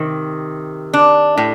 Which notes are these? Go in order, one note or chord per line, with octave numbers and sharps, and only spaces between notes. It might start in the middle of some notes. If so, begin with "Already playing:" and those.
Already playing: C3 D#3
D4
A2